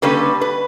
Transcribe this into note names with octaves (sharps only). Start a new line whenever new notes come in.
D3 G3 A#3 C#4 B4
B4